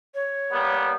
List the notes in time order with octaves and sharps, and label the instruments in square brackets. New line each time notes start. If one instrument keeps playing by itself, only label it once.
[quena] C#5
[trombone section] G3 A#3 B3